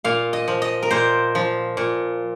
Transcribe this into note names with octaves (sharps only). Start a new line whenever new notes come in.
A#2 F5
D#5
F3
D#5
A#4
A#2 C5
F3
A#2